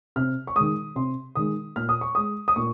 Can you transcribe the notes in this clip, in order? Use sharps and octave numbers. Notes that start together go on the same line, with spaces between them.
C3 F6
C#6
D#3 G#3 D#6
C3 C6
D#3 G#3 D#6
A#2 F6
D#6
C#6
G#3 D#6
D#6
A#2 C#6